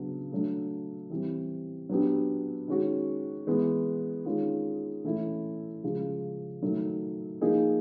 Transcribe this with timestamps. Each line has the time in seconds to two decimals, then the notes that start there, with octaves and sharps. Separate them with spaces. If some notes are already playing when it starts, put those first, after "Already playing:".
Already playing: C#3 F#3 B3 D4
0.32 F#3 A3 D4
1.10 E3 G3 C4
1.89 F#3 B3 D4 G4
2.68 D#3 G#3 C#4 F#4
3.47 E3 G#3 B3
4.25 D#3 G#3 C#4 F4
5.04 E3 A3 C#4 E4
5.84 C#3 F3 G#3
6.62 D#3 F#3 A3
7.41 F3 A#3 D#4 G#4